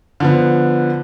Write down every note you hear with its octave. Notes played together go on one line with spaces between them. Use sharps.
D3 F3 B3